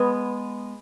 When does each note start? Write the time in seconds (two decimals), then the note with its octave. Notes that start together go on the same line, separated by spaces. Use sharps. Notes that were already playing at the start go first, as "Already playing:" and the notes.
Already playing: G#3 B3